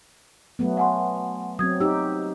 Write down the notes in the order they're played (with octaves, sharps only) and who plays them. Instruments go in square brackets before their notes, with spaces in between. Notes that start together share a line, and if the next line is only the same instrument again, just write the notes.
[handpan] F#3 A3 B3
[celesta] F#5 G#5 C6
[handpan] F#3 C4 [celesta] D#6 G#6
[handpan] D#4 G4 [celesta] E6